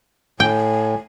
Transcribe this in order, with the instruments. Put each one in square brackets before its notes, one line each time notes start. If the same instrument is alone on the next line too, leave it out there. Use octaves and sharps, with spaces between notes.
[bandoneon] A2 [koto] G5 [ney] G#5